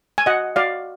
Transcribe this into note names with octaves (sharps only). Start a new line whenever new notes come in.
G#5
F#4 D#5 F#5
F#4 D5 F5